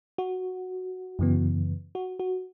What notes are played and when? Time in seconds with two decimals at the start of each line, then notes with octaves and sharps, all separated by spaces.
0.18 F#4
1.19 F#2 C#3 E3 B3
1.95 F#4
2.19 F#4